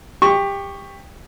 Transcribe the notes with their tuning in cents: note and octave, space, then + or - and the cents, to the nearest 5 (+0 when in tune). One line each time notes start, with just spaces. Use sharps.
G4 +20 C#6 +0